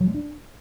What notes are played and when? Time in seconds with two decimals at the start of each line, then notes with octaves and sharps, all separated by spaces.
0.01 F#3
0.08 G#3
0.14 D4